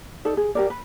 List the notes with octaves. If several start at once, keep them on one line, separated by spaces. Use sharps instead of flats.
D#4 A4 D5
G#4
G4 A#4 D5
B4